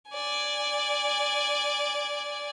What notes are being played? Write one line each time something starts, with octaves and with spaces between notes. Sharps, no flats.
D5 G#5